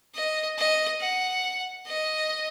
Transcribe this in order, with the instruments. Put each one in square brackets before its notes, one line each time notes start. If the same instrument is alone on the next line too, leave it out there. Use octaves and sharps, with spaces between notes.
[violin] D#5
D#5
F#5
D#5